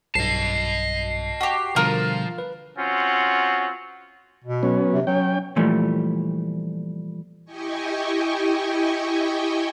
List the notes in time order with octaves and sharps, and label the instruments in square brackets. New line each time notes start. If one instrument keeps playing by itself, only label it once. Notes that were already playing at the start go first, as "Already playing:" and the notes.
[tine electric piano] B1 G2 [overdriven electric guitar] D#5 A5 [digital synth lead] C7
[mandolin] F#4 G4
[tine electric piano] B2 D3 G3 [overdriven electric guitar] F3 [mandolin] F4 A#4
[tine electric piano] B4
[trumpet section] C4 C#4 F4 F#4
[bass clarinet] B2
[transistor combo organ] F#3 B3 C#4
[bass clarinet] C3
[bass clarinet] F#3 [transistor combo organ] C#4 G5
[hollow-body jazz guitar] A#2 E3 F3 G3 A3
[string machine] E4 G4 D#5 G5 G#5 C#6